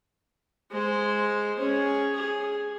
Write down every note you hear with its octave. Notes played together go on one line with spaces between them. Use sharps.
G#3 C5
C#4 G#4
G#4